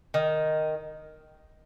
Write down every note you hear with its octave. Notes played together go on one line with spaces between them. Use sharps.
D#3